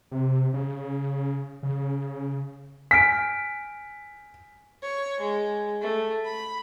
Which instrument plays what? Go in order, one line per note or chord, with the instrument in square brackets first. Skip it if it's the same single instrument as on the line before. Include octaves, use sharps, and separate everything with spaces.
[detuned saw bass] C3
C#3
C#3
[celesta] G#5 F6 D7 [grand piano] B6
[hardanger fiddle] C#5
G#3
A3
B5